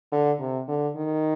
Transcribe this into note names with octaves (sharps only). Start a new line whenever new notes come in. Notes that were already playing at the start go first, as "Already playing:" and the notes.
D3
C3
D3
D#3